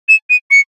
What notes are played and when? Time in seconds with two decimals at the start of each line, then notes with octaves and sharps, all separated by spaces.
0.09 E7
0.30 D#7
0.51 C#7